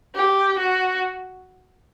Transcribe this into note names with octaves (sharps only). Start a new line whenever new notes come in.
G4
F#4